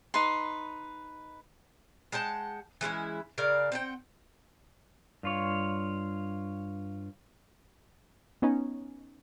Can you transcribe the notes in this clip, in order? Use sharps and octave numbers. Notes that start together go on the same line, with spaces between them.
D#4 B4 C6
G#3 F#5 G5 A5
E3 G#3 C#4 E4
C#3 A#4 D5 F5
C4 F#5 G5
G2 F4 C#5
B3 C#4 D#4